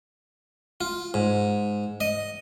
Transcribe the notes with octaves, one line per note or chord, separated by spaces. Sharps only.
F4
G#2
D#5